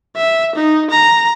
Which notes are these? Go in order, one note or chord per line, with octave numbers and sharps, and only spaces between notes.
E5
D#4
A#5